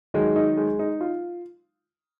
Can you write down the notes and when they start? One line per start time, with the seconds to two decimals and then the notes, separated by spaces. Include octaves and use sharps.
0.14 D#3 F#3 G#3
0.36 D#4
0.57 G#3
0.79 D#4
1.01 F4